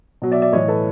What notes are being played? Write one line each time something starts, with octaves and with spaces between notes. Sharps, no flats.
B2 F#3
D5 E5
D5 E5
A2 E3 C#5 D#5
A4 B4